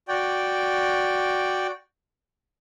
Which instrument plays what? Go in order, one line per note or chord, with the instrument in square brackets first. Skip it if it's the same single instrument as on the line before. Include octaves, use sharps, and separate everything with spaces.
[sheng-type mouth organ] F#4 D5 G5